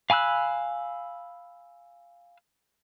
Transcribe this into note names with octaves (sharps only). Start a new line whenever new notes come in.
F5 G#5 B5 E6 F#6